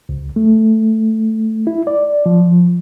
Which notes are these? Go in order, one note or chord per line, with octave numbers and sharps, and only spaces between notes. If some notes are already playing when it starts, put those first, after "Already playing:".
C#2
A3
E4
D5
F3